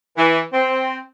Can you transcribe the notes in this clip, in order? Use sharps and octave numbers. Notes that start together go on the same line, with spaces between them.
E3
C4